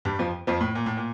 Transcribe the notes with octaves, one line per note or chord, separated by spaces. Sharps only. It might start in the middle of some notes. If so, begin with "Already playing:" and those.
G2 G3
F2 F3
F2 F3
A2
A#2
A2
A#2